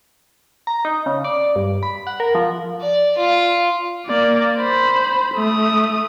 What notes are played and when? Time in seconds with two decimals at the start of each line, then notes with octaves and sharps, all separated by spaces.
0.67 A#5
0.85 D#4
1.06 C#3
1.24 D5
1.56 G2
1.83 B5
2.07 F#5
2.20 A#4
2.35 F3
2.81 D5
3.18 F4
4.06 A#3 D5
4.58 C5 B5
5.34 A3 D#6